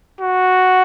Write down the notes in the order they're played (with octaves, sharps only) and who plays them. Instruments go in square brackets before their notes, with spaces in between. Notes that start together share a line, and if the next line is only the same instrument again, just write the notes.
[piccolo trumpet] F#4